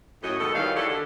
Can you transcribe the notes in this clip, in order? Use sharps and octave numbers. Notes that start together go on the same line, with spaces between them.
F#2 A2 F#4 D#5
B2 D#3 G#3 A4
E2 D#3 F#3 G3 F5
E4 F#4 G4 A4
D3